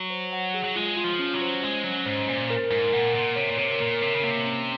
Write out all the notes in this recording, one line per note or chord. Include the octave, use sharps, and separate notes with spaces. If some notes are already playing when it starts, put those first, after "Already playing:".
Already playing: F#3
C5
F#5
G#4
F#3
G#3 F4
F4
F3
C#4
F#3
C5
G#3 C5
F#3 C#4
G#2 C5
A#2 C5
A#4
G#2 A#4
A#2 F#5
A#2 A#4
C3 C#5
A#2
C3 A#4
A#2 A#4
C3 C#5
C#3
C3 A#3
C#4